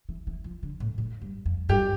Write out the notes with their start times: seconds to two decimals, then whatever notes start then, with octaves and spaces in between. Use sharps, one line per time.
0.09 E3
0.27 E3
0.44 F3
0.63 D3
0.80 A2
0.98 A2
1.22 G2
1.46 F2
1.69 G2 G4